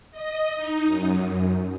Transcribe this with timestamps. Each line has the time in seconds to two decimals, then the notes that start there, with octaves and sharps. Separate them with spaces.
0.11 D#5
0.56 D#4
0.85 F#2